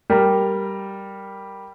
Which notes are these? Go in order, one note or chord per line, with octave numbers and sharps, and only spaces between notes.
G3 A#4